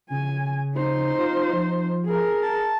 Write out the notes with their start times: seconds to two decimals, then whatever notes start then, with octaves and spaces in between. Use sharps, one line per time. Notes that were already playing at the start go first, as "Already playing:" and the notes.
0.10 C#3 G#5
0.75 D#4 C5
1.19 F4
1.53 F3
2.05 G#4 A#4
2.42 A5